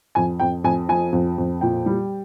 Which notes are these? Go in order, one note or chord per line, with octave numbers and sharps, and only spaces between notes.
F2 G#5
F2 G5
F2 G#5
F3 G#5
F2
F2
A#2 G5
G3